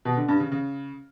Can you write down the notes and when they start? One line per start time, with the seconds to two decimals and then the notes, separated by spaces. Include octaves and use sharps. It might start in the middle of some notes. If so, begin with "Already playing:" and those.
0.05 B2
0.17 D3
0.28 G2
0.40 C#3
0.52 C#3